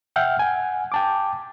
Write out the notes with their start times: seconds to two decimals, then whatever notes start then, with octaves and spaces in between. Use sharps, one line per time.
0.16 E5 F#5 G5 F6 G6
0.39 F#5 G#5
0.92 G5 A5 D6